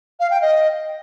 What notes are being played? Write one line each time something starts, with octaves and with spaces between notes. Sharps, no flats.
F5
G5
D#5